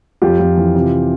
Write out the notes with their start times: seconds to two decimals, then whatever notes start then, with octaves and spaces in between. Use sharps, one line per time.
0.22 F2 F4 G4
0.39 F2
0.57 E3
0.75 C3